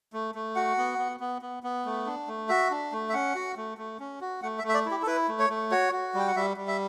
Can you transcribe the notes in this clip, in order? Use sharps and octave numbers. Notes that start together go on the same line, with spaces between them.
A3
A3
F#4 F#5
B3
B3
B3
B3
B3
A3
D4
A3
F#4 E5
D4
A3
E5
C#4 F#5
F#4
A3
A3
C#4
F#4
A3 F#5
E5
A3
E5
D5
E4
G4
A4
E4 B4
A3
C#5
A3
F#4 C#5
F#4
G3 G5
F#5
G3 E5
G3
E5